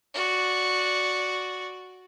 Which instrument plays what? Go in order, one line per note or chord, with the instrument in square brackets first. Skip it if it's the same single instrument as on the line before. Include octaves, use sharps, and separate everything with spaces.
[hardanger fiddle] F#4 D5